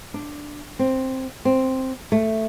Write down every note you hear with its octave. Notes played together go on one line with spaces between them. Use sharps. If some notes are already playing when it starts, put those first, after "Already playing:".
D4
C4
C4
A3